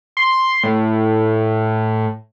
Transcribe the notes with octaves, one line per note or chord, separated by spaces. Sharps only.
C6
A2